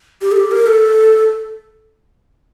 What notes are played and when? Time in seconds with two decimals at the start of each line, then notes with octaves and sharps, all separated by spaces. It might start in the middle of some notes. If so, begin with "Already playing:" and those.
0.22 G4
0.32 A4
0.37 G4
0.51 A#4
0.67 A4